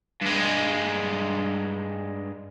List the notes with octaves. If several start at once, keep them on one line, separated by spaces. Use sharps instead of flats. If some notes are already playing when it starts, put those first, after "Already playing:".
G2 G#3